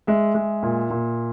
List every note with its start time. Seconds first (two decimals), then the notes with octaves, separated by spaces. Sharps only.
0.07 G#3 E5
0.35 G#3
0.63 A#2
0.90 A#2